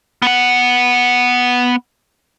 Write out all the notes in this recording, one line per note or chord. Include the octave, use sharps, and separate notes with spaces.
B3 F#5